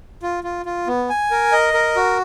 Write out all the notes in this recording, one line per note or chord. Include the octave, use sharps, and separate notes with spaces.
F4
F4
F4
B3
G#5
A#4
D#5
A#4
F#4